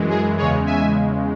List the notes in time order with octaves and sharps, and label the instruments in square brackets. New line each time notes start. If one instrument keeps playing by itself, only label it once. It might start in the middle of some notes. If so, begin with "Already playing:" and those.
Already playing: [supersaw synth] F#2 E3 G#3
G#4
E2 C#3 G#3 G#4 C#5
E5 G#5